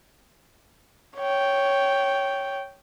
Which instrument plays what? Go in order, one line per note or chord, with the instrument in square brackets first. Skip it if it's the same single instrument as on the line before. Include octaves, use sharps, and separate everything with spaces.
[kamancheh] C#5 G5